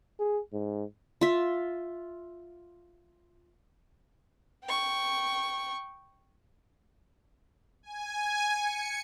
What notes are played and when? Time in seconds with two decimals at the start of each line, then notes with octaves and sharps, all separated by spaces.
0.19 G#4
0.53 G#2
1.21 F4 E5
4.64 G5 C#6
7.83 G#5
8.55 C#7